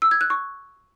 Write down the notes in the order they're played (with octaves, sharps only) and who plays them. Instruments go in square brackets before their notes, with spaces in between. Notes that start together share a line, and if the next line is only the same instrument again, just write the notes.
[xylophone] E6
G#6
F#6
C#6